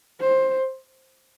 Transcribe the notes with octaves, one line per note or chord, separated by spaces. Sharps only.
C5